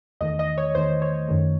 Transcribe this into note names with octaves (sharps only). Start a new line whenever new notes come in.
E2 D#3 A3 D#5
D#5
C#5
E2 D#3 A3 C5
C#5
F#2 D#3 A3